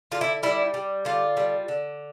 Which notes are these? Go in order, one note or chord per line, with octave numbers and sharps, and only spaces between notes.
D3 F4
E4
G3 E4
G3
D3 F4
G3
D3